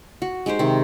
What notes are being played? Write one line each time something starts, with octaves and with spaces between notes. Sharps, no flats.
F#4
G#3 D#4 G4 C5
C3 D#3